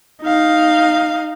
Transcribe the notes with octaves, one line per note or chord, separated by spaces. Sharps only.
D#4 F5